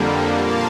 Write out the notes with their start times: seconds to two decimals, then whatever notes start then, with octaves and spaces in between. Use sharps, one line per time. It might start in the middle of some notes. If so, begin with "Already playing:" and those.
Already playing: F2 D3 G3 A#3
0.34 A#2 F3 A#3 F5 A5